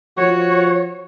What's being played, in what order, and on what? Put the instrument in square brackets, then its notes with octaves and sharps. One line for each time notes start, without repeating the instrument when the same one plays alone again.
[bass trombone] F3 [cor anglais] F#4 [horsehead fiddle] C#5